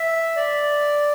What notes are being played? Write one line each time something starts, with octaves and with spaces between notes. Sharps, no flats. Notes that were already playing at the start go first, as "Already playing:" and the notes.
Already playing: E5
D5